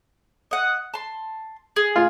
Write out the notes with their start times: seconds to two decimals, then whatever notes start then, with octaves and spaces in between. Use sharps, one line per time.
0.51 D#5 F#5
0.94 A5 C6
1.76 G#4
1.96 F4